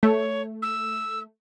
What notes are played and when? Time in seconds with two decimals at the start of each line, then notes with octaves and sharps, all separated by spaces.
0.03 A3 C#5
0.62 E6